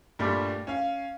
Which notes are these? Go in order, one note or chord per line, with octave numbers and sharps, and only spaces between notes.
G2 A#2 G3 A3
C#4 F5